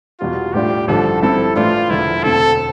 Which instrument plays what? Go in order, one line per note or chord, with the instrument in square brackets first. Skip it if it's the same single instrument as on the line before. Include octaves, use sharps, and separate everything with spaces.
[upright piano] E2 B2 G3 [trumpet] F4
[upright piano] A2 G3 D4 F4 [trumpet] G4
[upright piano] A1 G2 D3 F3 [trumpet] A4
[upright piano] G2 F3 C4 E4 [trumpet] A4
[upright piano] A2 E3 A3 D4 [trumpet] F4
[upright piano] E1 E2 D3 F3 [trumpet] E4
[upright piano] E1 D2 D3 A3 C4 [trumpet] A4